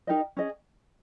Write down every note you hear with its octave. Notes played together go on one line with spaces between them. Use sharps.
D#4 G4 A#4 D#5
C#4 G#4 D#5